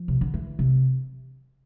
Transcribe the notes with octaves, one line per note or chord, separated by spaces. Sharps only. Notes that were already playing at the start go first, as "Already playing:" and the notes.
Already playing: F3
C3
D3
E3
C3